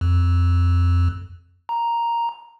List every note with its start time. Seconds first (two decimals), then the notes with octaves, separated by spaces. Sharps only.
0.01 F2
1.69 A#5